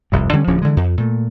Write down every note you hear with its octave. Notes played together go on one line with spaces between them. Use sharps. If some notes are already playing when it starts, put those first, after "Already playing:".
F1 C2 G2
D3 G3 A#3 C#4
D1 D2 F3 C#4
D3 E3 G#3
F2
A#2 A3